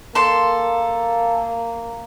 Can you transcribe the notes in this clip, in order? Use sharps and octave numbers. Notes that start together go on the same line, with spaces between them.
A#3 A4 C6